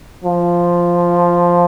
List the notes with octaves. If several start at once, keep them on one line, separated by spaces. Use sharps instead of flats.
F3